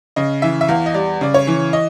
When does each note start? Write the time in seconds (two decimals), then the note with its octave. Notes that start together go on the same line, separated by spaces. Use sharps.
0.16 C#3 D#5
0.42 E3 E5
0.61 E5
0.69 E2 F5
0.86 D#5
0.94 G3 D5
1.21 C#3 D5
1.34 C#5
1.47 E3
1.73 D#5